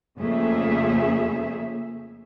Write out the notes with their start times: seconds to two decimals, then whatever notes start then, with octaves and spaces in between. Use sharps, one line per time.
0.19 F2 C#3 A3 A#3 G#4 E5